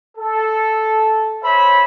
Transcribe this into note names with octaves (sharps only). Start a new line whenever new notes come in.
A4
C5 C#5 E5 B5